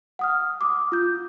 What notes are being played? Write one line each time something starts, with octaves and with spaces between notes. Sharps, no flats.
F#5 D#6 F6
D6 D#6
F4 G6